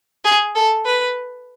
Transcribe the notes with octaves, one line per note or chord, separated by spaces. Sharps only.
G#4
A4
B4